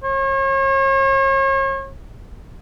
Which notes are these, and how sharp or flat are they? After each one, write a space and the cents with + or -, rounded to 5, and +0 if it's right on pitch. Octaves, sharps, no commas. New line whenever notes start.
C#5 -40